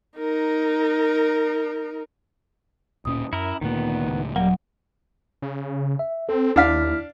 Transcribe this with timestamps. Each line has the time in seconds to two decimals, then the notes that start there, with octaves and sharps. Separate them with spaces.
0.18 D#4 A#4
3.05 D1 A#2 C#4 D#6
3.33 F#2 E4 A#4
3.61 D2 A#2 D#3 A#3 B3
4.07 C#2 A2
4.36 D#1 F#3 G3 A#3
5.42 C#3
5.99 E5
6.29 C4 A4
6.56 D#2 D4 E4 F5 F6 B6